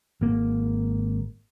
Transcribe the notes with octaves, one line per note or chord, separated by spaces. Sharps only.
G#1 A#3